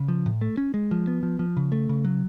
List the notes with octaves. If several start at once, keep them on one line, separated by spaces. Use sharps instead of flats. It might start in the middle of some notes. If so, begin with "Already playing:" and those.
Already playing: C#3
F3
A2
A3
C#4
G#3
F3
B3
F3
F3
C#3
A3
C#3
F#3